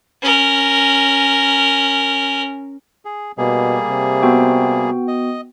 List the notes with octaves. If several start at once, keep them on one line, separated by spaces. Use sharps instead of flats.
C#4 A#4
G#4
B2 G3 A#3 G#4
C3
B3 F#4 G5
D#5